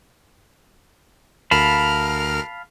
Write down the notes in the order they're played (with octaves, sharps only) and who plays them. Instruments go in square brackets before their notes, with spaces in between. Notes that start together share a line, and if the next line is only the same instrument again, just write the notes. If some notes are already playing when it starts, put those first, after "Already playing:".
[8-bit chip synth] D2 A#4 F6 [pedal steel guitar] F5 A5 B5